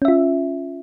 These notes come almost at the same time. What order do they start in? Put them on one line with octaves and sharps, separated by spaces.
C#4 E5 F4